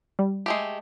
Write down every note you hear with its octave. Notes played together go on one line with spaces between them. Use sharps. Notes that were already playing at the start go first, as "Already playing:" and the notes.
G3
G#3 A3 G4